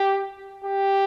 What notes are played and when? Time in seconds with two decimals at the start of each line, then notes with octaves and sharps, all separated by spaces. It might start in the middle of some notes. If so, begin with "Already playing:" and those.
Already playing: G4
0.64 G4